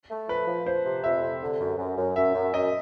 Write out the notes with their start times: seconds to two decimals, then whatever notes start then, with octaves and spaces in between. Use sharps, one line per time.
0.10 A3
0.29 F3 B4
0.48 F3
0.66 F3 C5
0.86 C3
1.04 F2 E5
1.23 C3
1.42 D3
1.60 F#2
1.78 F#2
1.97 F#2
2.16 F#2 E5
2.35 F#2
2.53 F#2 D#5